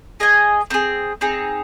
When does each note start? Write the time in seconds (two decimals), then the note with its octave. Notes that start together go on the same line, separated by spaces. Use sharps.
0.20 G#4 D#5 G#5
0.70 C4 D#4
0.74 G#4
1.21 C4 D#4 G#4